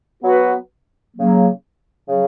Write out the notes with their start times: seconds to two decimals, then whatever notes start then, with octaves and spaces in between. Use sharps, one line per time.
0.23 F#3 B3 F#4 B4
1.15 C#3 F#3 A#3
2.09 C#3 F#3